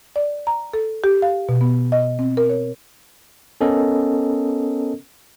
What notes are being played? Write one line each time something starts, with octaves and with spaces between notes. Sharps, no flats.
D5
A#5
A4
G4
F5
B2
B3
D#5
C4
A#4
C#5
B3 C#4 A4 A#4 D#5